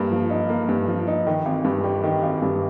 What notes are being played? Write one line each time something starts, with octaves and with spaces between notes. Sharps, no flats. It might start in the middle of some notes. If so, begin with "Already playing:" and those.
Already playing: G2 A#3
F3
D#4
A#3
G2
F3
D#4
D#3
G#1
G2
G3
D#3
G#1
G2